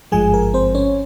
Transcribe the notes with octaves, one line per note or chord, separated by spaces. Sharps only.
G#1 G2 F3 G#3 G#4 G#5
A#4
C4 C5
C#4 C#5